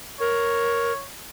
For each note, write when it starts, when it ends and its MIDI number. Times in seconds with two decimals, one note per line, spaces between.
0.20 0.92 70
0.20 1.06 73